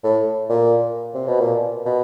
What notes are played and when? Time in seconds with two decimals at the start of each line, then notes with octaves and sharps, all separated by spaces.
0.04 A2
0.49 A#2
1.15 C3
1.28 B2
1.40 A#2
1.86 B2